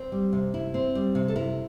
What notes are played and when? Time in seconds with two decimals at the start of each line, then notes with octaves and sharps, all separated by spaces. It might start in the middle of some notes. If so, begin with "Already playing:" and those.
Already playing: C4
0.12 G3
0.33 C3
0.54 E4
0.74 C4
0.95 G3
1.15 C3
1.28 A4
1.36 E4 A#4